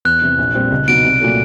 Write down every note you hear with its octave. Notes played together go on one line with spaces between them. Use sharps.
E2 F#6
C3 E3
A#1
A#2 G3 C4
C#2
B2 F#3 B3 D#4 D7
C2
A#2 F#3 A3